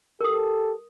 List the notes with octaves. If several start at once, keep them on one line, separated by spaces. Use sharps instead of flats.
G4 A4 A#4 D#6